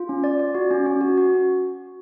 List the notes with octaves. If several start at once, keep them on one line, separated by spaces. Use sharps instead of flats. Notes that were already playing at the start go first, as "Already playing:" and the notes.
Already playing: F4
C#4
D5
D5
F#4
C#4
C#4
F#4
F#4